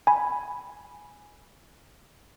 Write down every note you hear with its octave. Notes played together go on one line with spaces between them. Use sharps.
G#5 B5